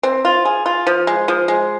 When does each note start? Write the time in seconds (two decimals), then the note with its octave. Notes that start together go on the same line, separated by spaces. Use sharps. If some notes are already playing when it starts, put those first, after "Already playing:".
0.03 C4
0.25 F4
0.45 G#4
0.66 F4
0.87 F3
1.07 G#3
1.28 F3
1.48 G#3